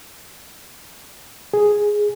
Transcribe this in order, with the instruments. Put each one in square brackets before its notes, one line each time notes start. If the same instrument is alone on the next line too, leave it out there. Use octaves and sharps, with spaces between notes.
[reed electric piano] G#4